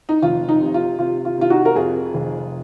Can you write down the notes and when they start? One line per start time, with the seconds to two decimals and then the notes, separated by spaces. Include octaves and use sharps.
0.09 D#4
0.22 F1 F4
0.49 D#4
0.61 C3
0.74 F4
0.99 C3 F4
1.25 F4
1.38 C3 F4
1.50 D#4 F#4
1.65 A#4
1.75 F2 F4 G#4
2.14 F1